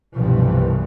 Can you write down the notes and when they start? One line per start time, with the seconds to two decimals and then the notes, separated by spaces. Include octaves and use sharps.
0.14 C2 G2 B2 E3 F3